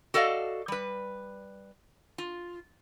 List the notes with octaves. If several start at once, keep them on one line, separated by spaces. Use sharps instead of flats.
F#4 A4 D5 D#5 F5
G3 B4
F4